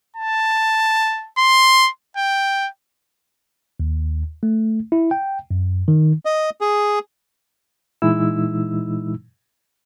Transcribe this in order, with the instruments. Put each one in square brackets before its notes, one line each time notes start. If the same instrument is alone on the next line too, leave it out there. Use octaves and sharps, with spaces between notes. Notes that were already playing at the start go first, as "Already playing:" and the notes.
[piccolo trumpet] A5
C6
G5
[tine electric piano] D#2
A3
E4
G5
F#2
D#3
[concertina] D#5
G#4
[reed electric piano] A#2 E3 G#3 D#4 E4 E6